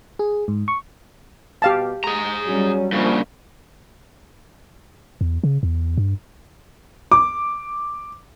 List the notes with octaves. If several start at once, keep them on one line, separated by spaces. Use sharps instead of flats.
G#4
G#2
C#6
B2 G4 F5 A5
G#3 G#4 A#5
F#3 G3 C#4
G2 C#3 F3 A#3
E2
C#3
E2
G2
D6